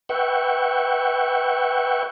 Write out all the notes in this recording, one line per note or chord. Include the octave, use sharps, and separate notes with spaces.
B4 E5 F#5 G5 C#6